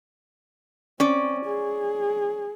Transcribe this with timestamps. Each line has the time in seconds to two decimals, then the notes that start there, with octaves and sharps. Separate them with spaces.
1.00 C4 C#4 D5
1.45 G#4